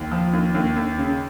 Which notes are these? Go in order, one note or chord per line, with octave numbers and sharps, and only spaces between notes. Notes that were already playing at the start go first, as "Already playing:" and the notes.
Already playing: D#2
F3
D#2
D#2
D#2
C#3